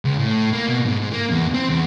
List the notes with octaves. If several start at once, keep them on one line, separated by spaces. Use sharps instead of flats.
C#2
A2
A#3
B2
G#2
A#3
E2
C4
E2